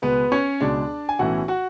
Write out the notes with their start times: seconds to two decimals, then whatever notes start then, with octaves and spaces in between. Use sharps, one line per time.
0.02 C#2 B2 G#3 B3 B4
0.32 C#4 C#5
0.61 C#2 B2 G#3 D4 D5
1.09 G#5
1.19 B1 A2 E3 A3 C#4 F#4 F#5
1.48 F#4 F#5